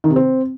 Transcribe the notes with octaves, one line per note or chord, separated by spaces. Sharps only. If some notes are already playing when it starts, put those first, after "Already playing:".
D#3
C3
C4